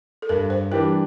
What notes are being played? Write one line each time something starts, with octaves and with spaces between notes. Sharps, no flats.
A4
G2 A#4
C5
E3 G3 D4 G4 A#4